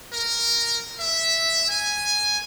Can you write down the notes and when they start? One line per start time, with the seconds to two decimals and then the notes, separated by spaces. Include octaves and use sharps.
0.13 A#4
0.99 E5
1.69 G#5